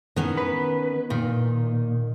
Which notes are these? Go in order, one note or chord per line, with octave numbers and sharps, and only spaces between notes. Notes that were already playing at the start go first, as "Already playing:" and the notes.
D#3 B3 C#4
B4
A#2 D#3